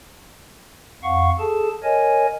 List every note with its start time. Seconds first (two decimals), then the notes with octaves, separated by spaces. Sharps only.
1.03 F2 F5 F#5 C#6
1.39 G#4 A4 A5
1.84 A#4 C#5 D#5 G#5